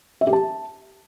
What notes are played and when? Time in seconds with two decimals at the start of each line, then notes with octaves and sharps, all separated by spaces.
0.21 E5
0.27 G4
0.33 A5